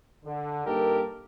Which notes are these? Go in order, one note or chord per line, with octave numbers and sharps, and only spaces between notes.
D3
G2 A#3 D#4 G4 A4 A#4